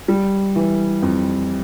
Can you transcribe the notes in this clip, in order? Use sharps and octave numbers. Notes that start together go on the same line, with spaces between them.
G3
E3
F2